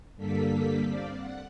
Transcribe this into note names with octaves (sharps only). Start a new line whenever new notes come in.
G2 D3 G3 A#3 A4 B6
C4 D5 F5
F#5